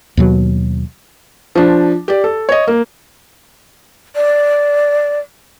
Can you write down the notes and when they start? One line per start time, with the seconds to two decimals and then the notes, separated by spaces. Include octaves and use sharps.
0.17 D#2 B2 F#3
1.55 F3 D4
2.08 G4 D5
2.24 A4
2.49 C#5 D#5
2.67 A#3
4.16 D5